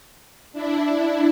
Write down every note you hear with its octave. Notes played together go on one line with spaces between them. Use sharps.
D4 E4